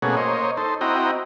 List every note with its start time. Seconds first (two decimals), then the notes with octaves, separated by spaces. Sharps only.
0.02 B2 A3 A#3 C#4 F#4 G#4
0.17 A#3 C5 C#5 D#5
0.57 D#4 A4 C5
0.81 C4 E4 F#4 D#5 G5 A#5